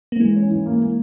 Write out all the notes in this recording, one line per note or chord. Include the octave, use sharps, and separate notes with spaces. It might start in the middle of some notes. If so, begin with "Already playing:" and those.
A#3
E3 G#3
C#4
E3
A#3
A#3